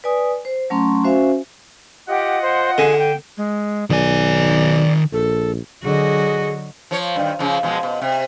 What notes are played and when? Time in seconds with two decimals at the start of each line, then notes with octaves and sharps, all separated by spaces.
0.04 B4 D5 G#5 D#6
0.45 C5
0.70 F#3 A3 C#4 A#5 C6 C#6
1.04 C#4 F#4 C5 E5 F5 G#5
2.08 F4 G4 D#5 F#5
2.42 C5
2.78 D3 G#4
2.98 G5
3.37 G#3
3.90 B1 D#3 D5 G#5
5.13 A#1 A4
5.83 D3 F#3 F#4 G#4 D#5
6.91 F3 C#5
7.16 G2 D#3
7.39 C#3 F3
7.63 B2 F3 G#3
7.83 B2
8.02 C3